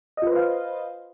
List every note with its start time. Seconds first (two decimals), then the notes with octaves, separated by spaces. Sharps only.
0.17 D#5
0.22 F4
0.27 B4
0.32 C5
0.36 F5